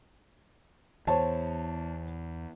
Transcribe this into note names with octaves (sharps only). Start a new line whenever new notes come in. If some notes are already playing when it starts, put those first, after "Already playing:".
E2 C5 C#5 A5